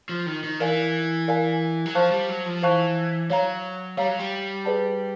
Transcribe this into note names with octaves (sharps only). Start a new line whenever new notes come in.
F3
D#3
D#3
E3 A#4 D5 F5 G#5
A#4 D5 F5 G#5
F#3
F3 C5 F5 A5 C#6 F#6
G3
F#3
F3
E3 C5 F5 A5 C#6 F#6
F#3 C#5 F5 A#5
G3 C#5 F5 A#5
F#3
G3
G#4 B4 D5 F#5 A5